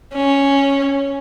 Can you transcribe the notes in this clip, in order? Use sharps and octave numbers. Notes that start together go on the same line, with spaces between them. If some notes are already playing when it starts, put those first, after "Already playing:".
C#4